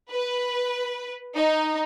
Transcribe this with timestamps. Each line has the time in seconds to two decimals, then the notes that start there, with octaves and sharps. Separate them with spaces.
0.10 B4
1.35 D#4